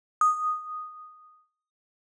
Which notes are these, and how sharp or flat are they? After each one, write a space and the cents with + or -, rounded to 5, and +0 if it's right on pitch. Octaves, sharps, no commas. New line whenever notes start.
D#6 -5